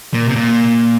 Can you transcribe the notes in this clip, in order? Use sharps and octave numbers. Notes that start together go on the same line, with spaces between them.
A#2
C3
A#2